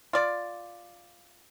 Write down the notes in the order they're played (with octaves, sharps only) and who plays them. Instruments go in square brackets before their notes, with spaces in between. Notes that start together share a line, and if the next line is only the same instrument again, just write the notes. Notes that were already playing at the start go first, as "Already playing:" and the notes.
[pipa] F4 D5